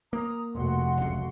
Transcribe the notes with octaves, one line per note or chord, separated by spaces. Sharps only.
A#3 A#5 D#6
F1 F#4 F#5 C6
F#1 C#2